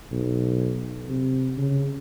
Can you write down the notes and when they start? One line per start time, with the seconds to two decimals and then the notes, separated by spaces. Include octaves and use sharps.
0.12 B1
1.08 C3
1.57 C#3